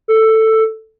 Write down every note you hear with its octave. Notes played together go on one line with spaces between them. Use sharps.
A4